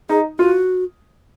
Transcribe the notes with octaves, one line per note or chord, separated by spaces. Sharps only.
D#4 G#4
F4 F#4